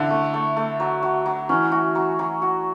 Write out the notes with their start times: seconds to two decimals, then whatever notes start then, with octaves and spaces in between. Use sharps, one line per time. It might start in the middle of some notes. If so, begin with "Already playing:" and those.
Already playing: D3 E4 A4 E5
0.10 A3
0.34 A3
0.57 A3
0.80 F#3
1.03 F#3
1.26 F#3
1.49 E3 C#4
1.72 F#4
1.95 F#3
2.19 F#3
2.42 F#4